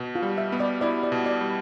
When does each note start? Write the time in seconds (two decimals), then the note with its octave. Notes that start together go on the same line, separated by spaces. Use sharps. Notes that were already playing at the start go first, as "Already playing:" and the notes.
Already playing: B2
0.15 F4
0.22 G3
0.38 E5
0.52 B3
0.60 D5
0.81 E4 D5
1.03 D5
1.12 B2
1.26 D5
1.41 G3